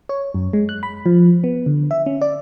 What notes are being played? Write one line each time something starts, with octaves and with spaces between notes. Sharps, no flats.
C#5
F#2
G#3
F#6
B5
F3
B3
D3
E5
C#4
D5